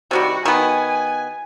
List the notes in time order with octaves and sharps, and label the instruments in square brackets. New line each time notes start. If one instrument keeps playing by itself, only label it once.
[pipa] C3 D#3 G3 [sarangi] F#4
[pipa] D#3 B3 [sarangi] G#5